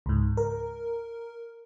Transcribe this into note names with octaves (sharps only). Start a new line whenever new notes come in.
C#2 G#2
A#4